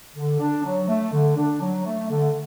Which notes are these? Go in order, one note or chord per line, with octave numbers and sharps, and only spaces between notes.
D3
D4
F#3
A3
D3
D4
F#3
A3
D3